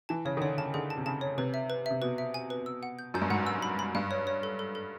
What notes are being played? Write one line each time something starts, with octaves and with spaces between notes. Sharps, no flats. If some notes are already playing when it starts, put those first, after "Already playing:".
E3 A5
C#3 C#5
D#3
D3 C#5
C#3 A5
D3 G#4
A5
C3
C#3 A5
C#5
C3 B4
E5
B4
C3 E5
B2 B4
E5
G#5
B4
E6
F#5
G6
F#2 G6
G2
G#2 F#5
E6
B5
B5
G2 F5
C#5
C#5
A4
A4
A4